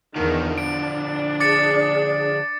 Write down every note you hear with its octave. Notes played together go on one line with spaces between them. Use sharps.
E2 D3 D#3 F3
D4 D7
G#4 D5 D6 A6 C#7